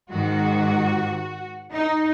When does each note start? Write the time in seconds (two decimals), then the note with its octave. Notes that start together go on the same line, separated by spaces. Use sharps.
0.11 G#2 D#3 G#3 F#4
1.73 D#4